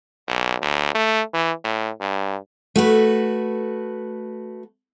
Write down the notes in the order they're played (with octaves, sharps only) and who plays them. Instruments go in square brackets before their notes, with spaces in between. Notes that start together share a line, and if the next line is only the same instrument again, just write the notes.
[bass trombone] B1
D2
A3
E3
A2
G2
[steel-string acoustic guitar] A3 F#4 B4